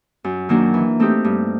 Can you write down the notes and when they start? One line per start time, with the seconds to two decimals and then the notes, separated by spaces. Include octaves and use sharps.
0.24 F#2
0.49 D#3 F#3 A#3 D4
0.74 E3
1.00 A3 C4 D#4 G4
1.24 G2